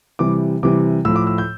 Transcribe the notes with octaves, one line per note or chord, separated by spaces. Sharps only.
C3 E3 G3 D6
C3 E3 G3 D6
A2 F3 E6
D6
E6
G6